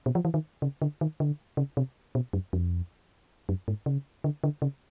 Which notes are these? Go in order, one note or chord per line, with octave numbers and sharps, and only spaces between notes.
B2
F3
E3
D#3
C#3
D3
D#3
D3
C#3
C3
B2
F#2
F2
F#2
G#2
C#3
D3
D3
C#3